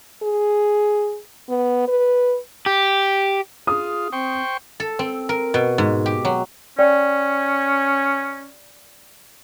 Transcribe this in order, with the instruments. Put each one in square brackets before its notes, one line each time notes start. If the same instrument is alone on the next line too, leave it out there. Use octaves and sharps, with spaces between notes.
[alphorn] G#4
B3
B4
[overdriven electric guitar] G4
[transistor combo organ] F4 [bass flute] G#4 [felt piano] D#6
[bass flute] C4 [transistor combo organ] C5 G5 C#6
[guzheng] A4
C4
A#4
B2
G#2
G4
F#3
[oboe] C#4 [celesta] D5 G5